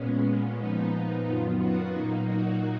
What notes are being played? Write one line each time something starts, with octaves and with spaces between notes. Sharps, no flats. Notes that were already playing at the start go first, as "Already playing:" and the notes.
Already playing: A#2 G#3 B3 C#4
A#2 F3 B3 D#4
F#2 D#3 F#3 B3 F4
F#4
A#2 F#3 A#3 D#4
F#4